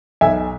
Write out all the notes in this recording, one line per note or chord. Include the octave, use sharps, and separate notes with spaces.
B1 E5 G#5